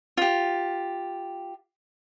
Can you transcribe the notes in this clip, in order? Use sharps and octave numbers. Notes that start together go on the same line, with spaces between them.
F4 G4